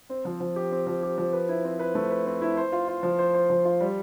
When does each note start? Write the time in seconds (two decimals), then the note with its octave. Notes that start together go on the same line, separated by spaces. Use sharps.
0.09 C4
0.25 F3
0.40 F3
0.56 G4
0.71 C4
0.87 F3
1.03 G4
1.18 F3
1.33 B4
1.49 E4
1.64 C4
1.79 B4
1.95 A3
2.10 B4
2.26 C4
2.41 E4
2.57 C5
2.72 F4
2.88 F4
3.03 F3
3.19 C5
3.34 C5
3.50 F3
3.65 F4
3.81 G3